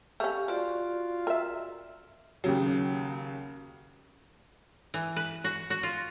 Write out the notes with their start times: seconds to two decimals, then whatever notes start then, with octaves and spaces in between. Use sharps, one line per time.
0.20 A3 C#4 G4 F5 C#6
0.48 F3 F4 F#4 D5
1.27 A#4 E5
2.44 D#2 C#3 F#3
4.94 E3
5.16 B4
5.44 F#4
5.70 F#4
5.83 F4